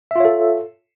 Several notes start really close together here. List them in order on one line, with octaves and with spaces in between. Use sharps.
E5 F4 C#5 A4